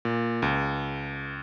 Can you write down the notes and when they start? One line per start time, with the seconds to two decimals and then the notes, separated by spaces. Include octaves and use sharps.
0.05 A#2
0.42 C#2